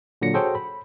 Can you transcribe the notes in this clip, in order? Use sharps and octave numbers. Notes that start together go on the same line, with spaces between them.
A#2 D3 F#3 A#6 C#7
F#4 G#4 A4 C5 C#5 G5
B5